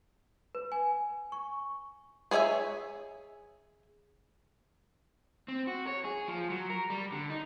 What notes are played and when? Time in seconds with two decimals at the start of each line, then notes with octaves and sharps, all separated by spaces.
0.55 B4
0.72 G#5
1.32 C#6
2.31 G#4 C#5 D5 E5 G#5
5.48 C4
5.67 F#4
5.87 C#5
6.05 G#4
6.28 F3
6.50 F#3
6.70 A#4
6.90 G3
7.12 D3
7.30 D#4